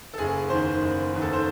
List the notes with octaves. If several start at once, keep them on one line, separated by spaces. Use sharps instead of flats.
A4
F#1 G#4
E2 D#3 C5
F#1
E2 D#3
A4
C5